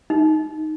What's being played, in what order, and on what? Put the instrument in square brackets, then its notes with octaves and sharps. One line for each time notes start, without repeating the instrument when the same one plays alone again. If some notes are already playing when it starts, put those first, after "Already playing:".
[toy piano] D#4